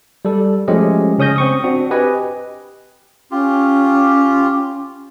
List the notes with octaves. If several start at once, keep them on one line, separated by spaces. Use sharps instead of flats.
G3 A4
F3 G#3 A3 C#4 G4 D#5
C#3 C#4 D#6 G6 A#6
C4 C#6 D#6
C4 D4 F#4
G4 B4 D#5 G#5
C#4 F4 G4